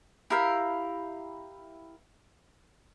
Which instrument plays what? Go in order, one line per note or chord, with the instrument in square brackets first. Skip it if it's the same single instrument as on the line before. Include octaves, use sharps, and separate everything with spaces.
[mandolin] E4 G4 A#4 F5